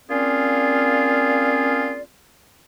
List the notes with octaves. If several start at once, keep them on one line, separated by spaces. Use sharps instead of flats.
A#3 C4 C#4 F4 G#4 D5